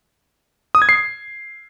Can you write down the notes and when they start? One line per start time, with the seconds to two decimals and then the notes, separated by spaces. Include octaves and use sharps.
0.75 D#6
0.82 G#6
0.89 C7